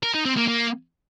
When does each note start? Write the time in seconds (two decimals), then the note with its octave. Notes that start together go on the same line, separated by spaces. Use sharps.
0.03 A#4
0.14 D#4
0.25 C4
0.37 A#3
0.48 A#3